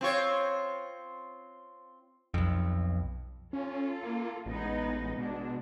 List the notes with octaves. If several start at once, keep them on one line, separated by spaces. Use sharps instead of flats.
C4 F4 C#5
B1 F2
C#4 F4 A4
A#3
A1 G#3 B3 D#4
B2 G#3 D4